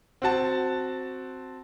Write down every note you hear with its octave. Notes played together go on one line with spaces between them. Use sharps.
C4 F#4 A5